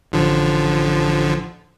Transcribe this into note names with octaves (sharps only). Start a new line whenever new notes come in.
A1 D3 F3